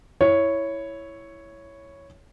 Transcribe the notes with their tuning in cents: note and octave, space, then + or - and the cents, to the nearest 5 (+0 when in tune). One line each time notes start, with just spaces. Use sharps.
E4 +0 C#5 +0